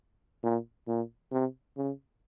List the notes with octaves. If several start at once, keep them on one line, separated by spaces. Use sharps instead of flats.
A#2
A#2
C3
C#3